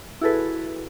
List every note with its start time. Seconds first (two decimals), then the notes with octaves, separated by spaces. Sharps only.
0.21 E4 F#4 G#4 A4 B4